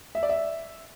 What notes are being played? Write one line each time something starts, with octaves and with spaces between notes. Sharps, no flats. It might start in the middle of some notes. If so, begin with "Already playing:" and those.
E5
D5
E5